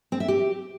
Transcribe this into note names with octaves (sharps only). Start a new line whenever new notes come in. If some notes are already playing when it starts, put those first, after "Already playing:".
C4
E5
G4